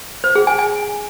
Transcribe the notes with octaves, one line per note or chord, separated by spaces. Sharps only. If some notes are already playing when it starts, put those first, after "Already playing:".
C5
G#4
G#5
G#5